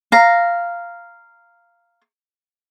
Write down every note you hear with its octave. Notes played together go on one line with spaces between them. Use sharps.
F5 A#5